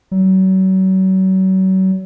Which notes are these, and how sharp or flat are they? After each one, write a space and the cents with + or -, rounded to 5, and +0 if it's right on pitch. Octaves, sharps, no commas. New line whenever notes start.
F#3 +35